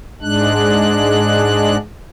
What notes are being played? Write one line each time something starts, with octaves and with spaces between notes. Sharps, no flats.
G#2 G#3 D4 F#6